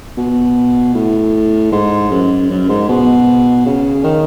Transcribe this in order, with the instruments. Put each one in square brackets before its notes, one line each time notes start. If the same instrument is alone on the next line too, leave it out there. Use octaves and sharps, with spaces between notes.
[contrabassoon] B2
A2
G#2
F#2
F#2
G#2
B2
C#3
D#3